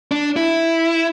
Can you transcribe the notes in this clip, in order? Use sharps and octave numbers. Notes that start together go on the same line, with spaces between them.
D4
E4